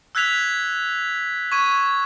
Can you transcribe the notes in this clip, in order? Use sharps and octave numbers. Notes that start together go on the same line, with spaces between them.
E6 F#6 G#6 B6 F7
C#6 G#6 D#7